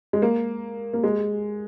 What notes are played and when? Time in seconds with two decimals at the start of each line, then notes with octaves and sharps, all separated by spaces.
0.13 G#3
0.22 A#3
0.94 A#3
1.03 G#3